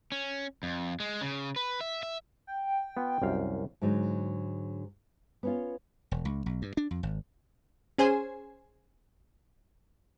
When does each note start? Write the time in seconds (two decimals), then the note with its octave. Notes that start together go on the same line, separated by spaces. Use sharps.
0.12 C#4
0.63 F2
1.00 G#3
1.21 C#3
1.56 B4
1.81 E5
2.03 E5
2.47 G5
2.97 B3 F4
3.22 C2 F#2 F5
3.81 G#2 D3 F#3 D#4
5.43 B3 C#4 F4
6.11 E1
6.25 C#2
6.46 B1
6.62 G2
6.77 D4
6.91 F2
7.03 G#1
7.98 C#4 G#4 C5 G#5